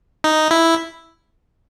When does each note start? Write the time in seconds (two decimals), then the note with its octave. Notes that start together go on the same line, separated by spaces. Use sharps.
0.24 D#4
0.51 E4